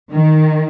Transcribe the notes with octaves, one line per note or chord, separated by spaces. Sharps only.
D#3